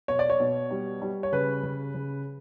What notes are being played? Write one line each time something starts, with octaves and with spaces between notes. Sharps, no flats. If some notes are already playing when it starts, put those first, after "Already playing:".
B2 C#5
D5
C#5
B2
G3
G3
C#5
C#3 B4
C#3
C#3